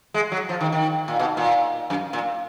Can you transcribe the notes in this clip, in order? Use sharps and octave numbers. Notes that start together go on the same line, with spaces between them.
G#3
F#3
F3
D#3
D#3
A#2
B2
A#2
F#2
A#2